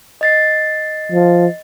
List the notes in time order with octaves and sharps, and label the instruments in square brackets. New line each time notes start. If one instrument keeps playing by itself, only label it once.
[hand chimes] D#5 A6 C7
[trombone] F3